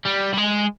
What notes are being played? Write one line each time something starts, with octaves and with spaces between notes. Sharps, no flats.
G3
G3
G#3